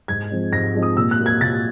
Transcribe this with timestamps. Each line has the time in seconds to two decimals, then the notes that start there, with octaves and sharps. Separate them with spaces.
0.08 G#2 G#6
0.30 F3 G#3 C4 D#4
0.53 G#2 A#6
0.75 F3 G#3 C4 D#4
0.82 D#6
0.97 A#2 E6
1.11 F#6
1.19 F#3 A#3
1.26 G#6
1.41 A#2 A6